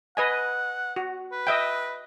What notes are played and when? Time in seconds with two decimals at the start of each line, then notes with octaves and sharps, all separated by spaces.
0.17 B4 D#5 F#5 G#5
0.96 F#4
1.32 B4
1.47 D#5 E5 G5